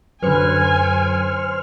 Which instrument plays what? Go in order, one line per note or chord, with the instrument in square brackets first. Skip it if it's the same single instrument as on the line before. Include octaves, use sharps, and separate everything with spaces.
[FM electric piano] F#2 F#3 C#7 [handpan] D3 B4 [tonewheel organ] C5 F6 [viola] G#5